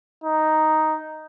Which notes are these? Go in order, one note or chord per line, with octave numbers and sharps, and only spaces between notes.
D#4